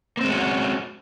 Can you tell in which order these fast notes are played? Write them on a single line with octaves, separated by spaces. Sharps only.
A#3 C4 G#3 C#4 F#4